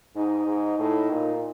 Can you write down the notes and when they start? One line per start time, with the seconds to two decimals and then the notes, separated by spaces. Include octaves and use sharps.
0.15 G#2 D#4
0.47 G#2
0.79 A2
1.11 A#2